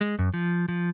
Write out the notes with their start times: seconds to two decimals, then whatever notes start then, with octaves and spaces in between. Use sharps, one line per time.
0.01 G#3
0.19 F#2
0.34 F3
0.69 F3